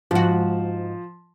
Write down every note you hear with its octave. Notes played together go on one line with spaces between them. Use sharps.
G#2 F3 F#4